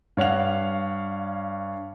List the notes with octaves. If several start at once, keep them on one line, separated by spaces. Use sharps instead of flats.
G2 C#5 F5 F#5 F7